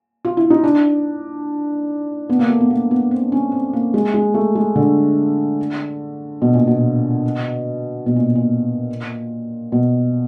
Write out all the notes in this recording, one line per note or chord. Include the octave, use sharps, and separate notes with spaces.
F4
E4
D#4
D4
B3
A#3
A3
B3
A#3
B3
C4
C#4
C4
A#3
G#3
G#3
A3
G#3
D3
B2
A#2
B2
B2
A#2
A#2
B2